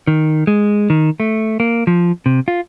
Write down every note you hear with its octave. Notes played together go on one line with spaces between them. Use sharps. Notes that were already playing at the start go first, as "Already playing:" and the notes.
D#3
G#3
D#3
A3
A#3
F3
C3
F4